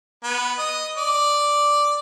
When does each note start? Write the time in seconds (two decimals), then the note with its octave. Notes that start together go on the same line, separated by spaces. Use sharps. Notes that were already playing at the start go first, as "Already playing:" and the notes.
0.24 B3
0.58 D#5
0.97 D5